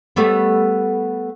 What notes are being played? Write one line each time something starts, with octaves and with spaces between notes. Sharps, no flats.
G3 A3 B3